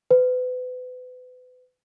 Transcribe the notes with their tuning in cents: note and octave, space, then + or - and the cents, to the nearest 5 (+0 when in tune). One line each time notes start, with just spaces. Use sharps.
B4 +35